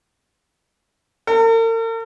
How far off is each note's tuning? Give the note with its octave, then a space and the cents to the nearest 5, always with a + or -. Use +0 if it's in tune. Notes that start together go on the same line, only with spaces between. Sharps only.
A#4 -45